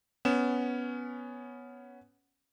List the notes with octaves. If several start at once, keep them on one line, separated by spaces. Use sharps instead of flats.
B3 C#4 E7